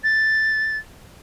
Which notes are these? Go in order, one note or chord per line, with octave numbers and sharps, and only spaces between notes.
A6